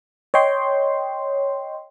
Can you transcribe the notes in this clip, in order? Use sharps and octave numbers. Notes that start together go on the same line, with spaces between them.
C#5 D#5 G5 C6